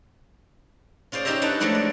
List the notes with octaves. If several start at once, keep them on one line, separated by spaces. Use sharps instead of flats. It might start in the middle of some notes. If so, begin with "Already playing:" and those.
C#4 F4 G#4 C5 D5
C#4 D#4 G4 C5 E5 A#5
D4 D#4 A4 B4 E5
F3 F#3 G#3 A3 D4 E4
D5